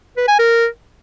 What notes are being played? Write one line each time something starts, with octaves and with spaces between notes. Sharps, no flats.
B4
G#5
A#4